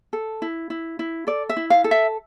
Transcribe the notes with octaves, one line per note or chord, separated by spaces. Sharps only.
A4
E4
E4
E4
A4 D5
E5
E4
F5
A4
E5